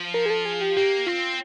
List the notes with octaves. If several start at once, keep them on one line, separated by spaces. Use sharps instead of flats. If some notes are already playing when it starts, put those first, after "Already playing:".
Already playing: F3
A#4
G#4
A4
G#4
G4
A#3 G4
C4 F4